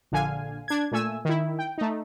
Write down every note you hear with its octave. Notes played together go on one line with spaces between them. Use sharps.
A#1 D3 F5 G#5
D4 G#6
A#2 A3 G#5 E6
D#3 E4
G5
A3 D#4